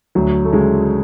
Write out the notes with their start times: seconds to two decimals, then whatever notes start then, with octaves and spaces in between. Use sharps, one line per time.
0.15 D2 F#3
0.45 A3
0.53 C#3 G#3